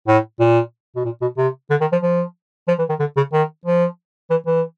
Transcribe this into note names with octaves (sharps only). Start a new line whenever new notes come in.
A2
A#2
B2
A#2
B2
C3
D3
D#3
F3
F3
F3
E3
D#3
D3
C#3
D#3
F3
E3
E3